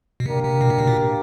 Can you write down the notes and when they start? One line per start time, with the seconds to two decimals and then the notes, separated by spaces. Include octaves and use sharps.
0.20 B2
0.26 C3 A#3 D4 G4 A#4
0.44 C3
0.61 B2
0.70 C3
0.78 B2
0.87 A#2